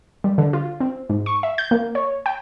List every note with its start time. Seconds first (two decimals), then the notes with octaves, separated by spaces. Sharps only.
0.24 G3
0.38 D3
0.53 F4
0.80 C4
1.10 G#2
1.26 C#6
1.43 E5
1.58 G6
1.71 A#3
1.95 C#5
2.26 G5